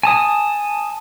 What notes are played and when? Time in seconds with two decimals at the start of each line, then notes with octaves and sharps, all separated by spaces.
0.03 G#5 A5 D#6